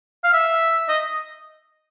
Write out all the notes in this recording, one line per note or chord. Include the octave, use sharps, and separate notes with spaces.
F5
E5
D#5